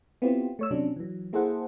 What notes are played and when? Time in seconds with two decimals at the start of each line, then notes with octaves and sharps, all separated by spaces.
0.22 B3 C4 E4 F4 G4
0.59 A3 C#5 E6
0.71 C3 F#3 C#4 D4
0.96 E3 F#3
1.33 A#3 E4 G#4 A4 C5 F#5